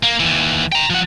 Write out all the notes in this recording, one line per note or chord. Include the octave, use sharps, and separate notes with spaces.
A#3
D#2 E3
G5 A#5
F3 F#5